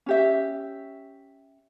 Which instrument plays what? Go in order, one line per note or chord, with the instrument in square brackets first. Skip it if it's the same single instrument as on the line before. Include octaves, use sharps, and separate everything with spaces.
[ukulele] C#4 G4 E5